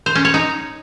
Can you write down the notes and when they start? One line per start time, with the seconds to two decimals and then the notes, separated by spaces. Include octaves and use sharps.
0.06 C5
0.15 C#4
0.25 C#5
0.34 D#4